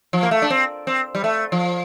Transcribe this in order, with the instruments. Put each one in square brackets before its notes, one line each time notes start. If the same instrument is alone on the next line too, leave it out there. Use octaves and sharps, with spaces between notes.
[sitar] F3
A#3
A3
D4
C4
C4
G3
A3
F3